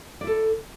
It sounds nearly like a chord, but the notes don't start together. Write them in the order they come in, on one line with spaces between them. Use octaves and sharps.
D5 E4 A4